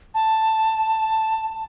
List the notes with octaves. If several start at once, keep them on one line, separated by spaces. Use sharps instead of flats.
A5